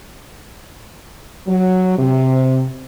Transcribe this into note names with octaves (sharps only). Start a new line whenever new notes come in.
F#3
C3